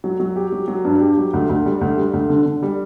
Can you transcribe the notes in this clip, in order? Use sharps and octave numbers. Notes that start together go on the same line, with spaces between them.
F#3
F#3
G4
F#3
F#3
G2
G4
F#3
D2
D2
G3
D2
G3
D2
D3
D3
G3